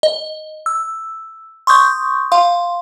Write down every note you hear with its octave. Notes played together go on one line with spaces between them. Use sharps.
D#5
E6
C6 C#6 D#6 G6
F5 C6